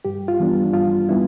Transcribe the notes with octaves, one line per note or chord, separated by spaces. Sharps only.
G2 G4
F4
E3 G3 B3 D4
G2 F4
G3 B3 D4 E4